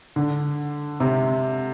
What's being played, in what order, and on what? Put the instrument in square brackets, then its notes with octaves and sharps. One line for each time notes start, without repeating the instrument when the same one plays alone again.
[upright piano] D3
C3